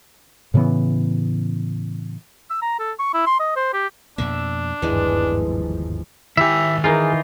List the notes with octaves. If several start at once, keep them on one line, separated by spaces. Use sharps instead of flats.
A2 C#3 E3 B3
E6
A#5
A4
C#6
E4
C6
D#5
C5
G4
F2 B2 A#3 D4 E5
G1 D#2 G#2 E3 F3 G#3
D#3 E4 G4 E5 G#5
E3 D#4 F4 G#4 A#4